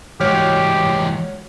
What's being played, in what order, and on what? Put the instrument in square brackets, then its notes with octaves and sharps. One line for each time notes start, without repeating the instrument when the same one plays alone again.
[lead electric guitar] E3 G3 [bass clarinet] G#3 [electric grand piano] F#4 C#5 F6 [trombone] G4